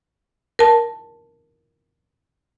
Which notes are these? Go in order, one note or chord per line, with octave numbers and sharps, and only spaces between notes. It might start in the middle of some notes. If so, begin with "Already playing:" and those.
A#4 A5